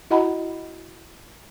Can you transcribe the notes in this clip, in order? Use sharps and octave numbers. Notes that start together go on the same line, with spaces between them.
E4 F#4 D#5 F#5 A#5 B5